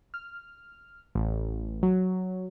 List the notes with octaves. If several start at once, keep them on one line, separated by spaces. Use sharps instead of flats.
F6
A1
F#3